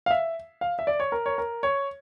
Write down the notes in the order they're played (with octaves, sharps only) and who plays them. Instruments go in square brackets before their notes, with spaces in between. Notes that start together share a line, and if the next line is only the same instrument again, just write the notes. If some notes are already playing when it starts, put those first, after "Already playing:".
[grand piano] F5
E5
F5
E5
D5
C#5
A#4
C#5
A#4
C#5